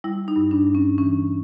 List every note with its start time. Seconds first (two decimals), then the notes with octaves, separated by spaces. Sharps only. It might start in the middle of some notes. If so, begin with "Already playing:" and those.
0.04 G3 E4
0.28 D#4
0.36 G2
0.51 D4
0.67 G2
0.75 C#4
0.98 E3 C#4